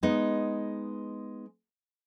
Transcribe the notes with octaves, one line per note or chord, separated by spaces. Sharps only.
G#3 B3 D#4